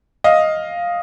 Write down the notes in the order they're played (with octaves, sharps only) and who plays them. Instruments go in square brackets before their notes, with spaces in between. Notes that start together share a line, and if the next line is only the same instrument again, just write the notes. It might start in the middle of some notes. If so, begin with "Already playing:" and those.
[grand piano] D#5 F5